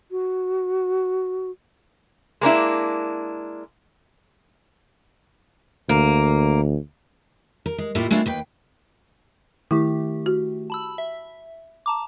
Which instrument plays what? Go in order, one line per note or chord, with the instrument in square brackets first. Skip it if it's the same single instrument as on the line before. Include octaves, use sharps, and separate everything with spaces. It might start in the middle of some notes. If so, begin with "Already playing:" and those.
[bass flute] F#4
[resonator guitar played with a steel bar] G#3 A#3 D4 E4
[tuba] D2 [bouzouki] A#3
[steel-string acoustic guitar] A#4
G#3
A2 A3 A#3 E4 F4 G4
G#3 A3 C4 D4 E4 F4
D#2 B4 G5
[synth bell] D#3 A3 G4 [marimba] E4
[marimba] F#4
[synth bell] A5 B5 E6
E5
A5 A#5 D6